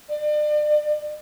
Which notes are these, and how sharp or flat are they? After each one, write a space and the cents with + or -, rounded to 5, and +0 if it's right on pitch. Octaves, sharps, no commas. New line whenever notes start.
D5 +35